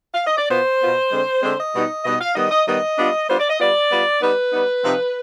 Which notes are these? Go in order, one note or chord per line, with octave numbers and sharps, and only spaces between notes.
F5
D#5
D5
B2 B3 F4 C5
B2 B3 F4
D3 G#3 C4
D3 G#3 C4 C5
D#5
B2 G3 B3 D#4
B2 G3 B3 D#4 D#5
F5
D#3 G3 B3 D#5
D#5
D#3 G3 B3 D#5
G3 B3 D4 F4
G3 B3 D4 F4 C5
D5
D#5
G3 B3 F4 D5
G3 B3 F4
G3 B3 D#4 B4
G3 B3 D#4
C3 F3 C4 D#4